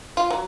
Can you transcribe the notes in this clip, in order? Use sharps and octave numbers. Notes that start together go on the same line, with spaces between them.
F4
F#3